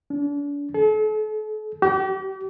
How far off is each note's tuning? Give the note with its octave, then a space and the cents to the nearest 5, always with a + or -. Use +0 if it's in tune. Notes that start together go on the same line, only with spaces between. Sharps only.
D4 -40
A4 -40
G4 -40